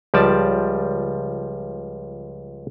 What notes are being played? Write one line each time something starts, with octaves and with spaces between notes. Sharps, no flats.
C#2 F3 G3 D5 A5